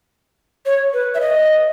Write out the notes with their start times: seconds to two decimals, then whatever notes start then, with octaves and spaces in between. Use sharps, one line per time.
0.66 C#5
0.93 B4
1.15 E5
1.21 D#5